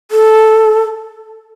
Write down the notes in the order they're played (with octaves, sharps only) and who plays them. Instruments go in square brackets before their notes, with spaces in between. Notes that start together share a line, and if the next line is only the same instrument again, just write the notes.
[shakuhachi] A4